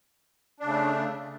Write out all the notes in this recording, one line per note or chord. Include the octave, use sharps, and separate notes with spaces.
C#3 A3 D4